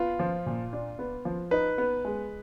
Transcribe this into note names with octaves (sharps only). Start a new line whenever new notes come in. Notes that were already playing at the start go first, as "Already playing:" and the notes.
Already playing: B3 F4
F3
A#2
D4
B3
F3
D#4 B4
B3
G#3